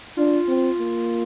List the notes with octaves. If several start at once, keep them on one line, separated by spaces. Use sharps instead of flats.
D4 F4
C4
A#3